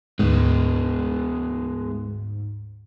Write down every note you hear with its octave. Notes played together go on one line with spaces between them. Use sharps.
D2 G#2 G#3 B3